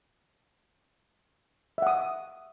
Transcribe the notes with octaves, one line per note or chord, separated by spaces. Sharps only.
E5 F#5 D#6